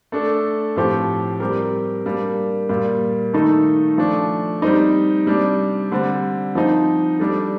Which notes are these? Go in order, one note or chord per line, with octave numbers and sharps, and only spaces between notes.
A3 D4 A4
A2 F3 C4 G4
G3 C4 G4 A#4
G3 A#3 D4
A#2 G3 A#3
D#3 A3 D#4 A4
F3 A3 D4
G3 C4 D#4
C3 G3 D4
D3 G3 C4
F3 C4 D#4
G3 D4 A4